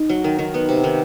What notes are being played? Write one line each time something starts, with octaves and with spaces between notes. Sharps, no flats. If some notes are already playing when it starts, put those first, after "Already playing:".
Already playing: D#4
F#3
D#3
D#3
B3
C3
D#3